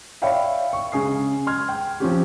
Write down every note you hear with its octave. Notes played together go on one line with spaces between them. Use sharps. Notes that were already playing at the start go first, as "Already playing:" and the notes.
C#5 D5 E5 F5 G5 B5
C#6
C#3 G#3 G#5 D#6 C7
C6 F6 G#6
G5
F3 C4 C#4 G4